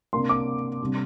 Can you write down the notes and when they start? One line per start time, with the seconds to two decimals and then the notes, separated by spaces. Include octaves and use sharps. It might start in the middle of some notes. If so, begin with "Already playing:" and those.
0.13 C3 A#3 D4 C6
0.29 D6
0.80 C3 G3 D4